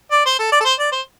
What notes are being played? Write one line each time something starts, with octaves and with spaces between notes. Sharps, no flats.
D5
C5
A4
D5
A4
C5
D5
C5